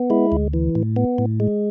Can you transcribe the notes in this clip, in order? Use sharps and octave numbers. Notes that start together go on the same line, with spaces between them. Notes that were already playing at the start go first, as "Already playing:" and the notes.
Already playing: B3
G#3 E4
D2
E3
A2
B3
A2
G#3